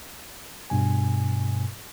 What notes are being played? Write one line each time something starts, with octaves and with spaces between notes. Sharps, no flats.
G2 B2 G#5